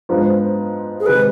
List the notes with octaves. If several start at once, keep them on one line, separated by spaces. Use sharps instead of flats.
G#2 F3 B3 D4 F4
G#4
C3 D#3 G#3 B4